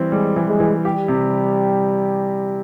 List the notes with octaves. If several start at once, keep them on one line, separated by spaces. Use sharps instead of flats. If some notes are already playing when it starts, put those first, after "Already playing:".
Already playing: E3 G3 C4
G3 G#3
E3
G#3
E3
G3 G4
C3